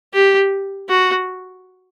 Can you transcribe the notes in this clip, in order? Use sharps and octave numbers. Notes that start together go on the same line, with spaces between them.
G4
F#4